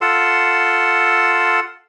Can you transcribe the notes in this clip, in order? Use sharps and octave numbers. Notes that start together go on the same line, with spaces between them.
F4 A4 F#5 C6 E6